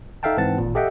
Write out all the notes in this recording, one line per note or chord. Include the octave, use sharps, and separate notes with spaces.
D#4 A4 E5 F5 G5 A5
G#2 E3 C4 F#5 A5 A6
G#1 A#2
G4 A4 D#5 E5 F#5 G5